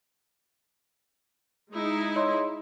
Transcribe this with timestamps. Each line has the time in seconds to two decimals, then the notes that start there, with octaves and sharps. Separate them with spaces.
1.74 G#3 D#4 E4
2.16 C#5 D#5 C6